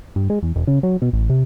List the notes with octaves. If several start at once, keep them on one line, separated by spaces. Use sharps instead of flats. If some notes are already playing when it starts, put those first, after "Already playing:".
G2
G#3
E2
E1
C#3
F#3
B2
A1
C3